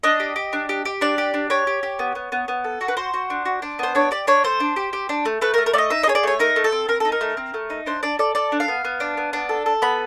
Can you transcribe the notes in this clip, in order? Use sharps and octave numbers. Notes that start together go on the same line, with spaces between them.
D4 D#5
G4
G4
D4
G4
G4
D4 D5
G4
D4
G4 C#5
G4
G4
B3
B3
B3
B3
A4
F#4
B4
F#4 C5
F#4
D4
F#4
D4
B3 C5
D4 C#5
G4 D5
D4 C#5
A3 C5
D4
G4
G4
D4
A3
A3 B4
A#4
A3
A#4
A3 D5 D#5
D#4 E5
D#5
G#4 C#5
D5
A3 C#5
D#4 A#4
A3
A4
C4
C4 A#4
D#4 A4
A#4
A3
C4
A3
D#4
D4 C5
D4 D5
A4 D5
A4 D5
D4
F5
B3
B3
D4
B3
D4
A4
A4
B3 B5